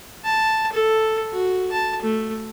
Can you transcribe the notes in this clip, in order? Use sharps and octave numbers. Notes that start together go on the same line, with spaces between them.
A5
A4
F#4
A5
A3